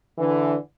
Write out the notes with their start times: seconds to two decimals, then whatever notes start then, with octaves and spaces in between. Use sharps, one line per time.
0.18 D3 E3